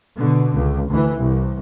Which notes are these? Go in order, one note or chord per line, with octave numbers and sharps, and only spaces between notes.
B2 D3
C#2
D2 E3
C2